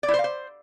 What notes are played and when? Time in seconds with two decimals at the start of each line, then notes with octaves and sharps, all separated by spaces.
0.03 D5
0.08 E4
0.14 C5
0.19 F5
0.24 C5